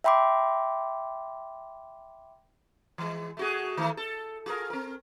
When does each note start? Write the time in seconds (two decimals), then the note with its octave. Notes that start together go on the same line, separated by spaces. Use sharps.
0.04 E5 G5 B5 C6 D6
2.98 E3 G#3
3.37 A3 F#4 G#4
3.77 D#3 A3
3.97 A4
4.46 F4 G#4 A#4
4.70 C4 A#4